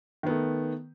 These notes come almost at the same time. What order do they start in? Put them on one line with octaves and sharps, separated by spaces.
D#3 B3 A3